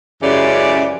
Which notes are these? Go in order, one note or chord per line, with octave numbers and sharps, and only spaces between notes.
F#2 C#3 E3 G#3 G4 D5